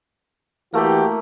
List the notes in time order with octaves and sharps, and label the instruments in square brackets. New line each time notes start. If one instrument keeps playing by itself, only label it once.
[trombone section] E3 F#4 G4 [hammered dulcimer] A3 A#3